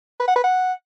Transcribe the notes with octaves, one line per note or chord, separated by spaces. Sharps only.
B4
F#5
B4
F#5